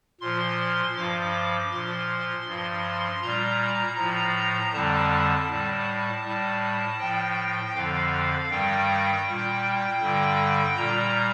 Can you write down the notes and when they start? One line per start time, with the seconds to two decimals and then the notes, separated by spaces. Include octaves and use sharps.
0.21 A#2 F3 C6
0.96 G2 F3 D6
1.72 A#2 F3 C6
2.47 G2 F3
3.22 A#2 G3 A#5
3.98 A2 F3
4.73 F2 D3 G3 A5
5.49 A2 G3
6.24 A2 G3
7.00 A2 F3 G5
7.75 F2 D3 F3 F5
8.50 G2 D#3 G3 G5
9.26 A#2 G3
10.02 G2 D3 G3
10.77 A#2 G3 A#5